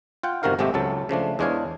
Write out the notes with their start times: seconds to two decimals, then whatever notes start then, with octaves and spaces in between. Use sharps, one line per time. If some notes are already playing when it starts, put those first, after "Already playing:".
0.23 F4 F#5 G5
0.43 G1 C3 D#3 F#4 A#4 F5
0.59 G#1 C3 G#3 A3 G4 E5
0.74 C#2 F#3 A4 A5
1.09 C#3 F3 A3 D4
1.39 E2 G#3 D4 C#5 F5 G#5